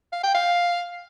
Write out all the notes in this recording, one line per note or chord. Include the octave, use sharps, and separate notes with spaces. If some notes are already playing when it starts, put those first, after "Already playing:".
F5
G5
F5